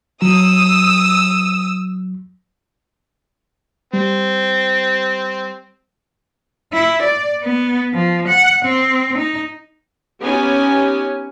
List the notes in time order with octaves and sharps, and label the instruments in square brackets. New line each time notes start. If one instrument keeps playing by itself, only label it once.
[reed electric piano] F#3 [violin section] D#6 E6
[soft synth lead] G3 [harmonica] C4
[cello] E4
D5
B3
F3
F#5
C4
D#4
[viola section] B3 C#4 D#4 G4 G#5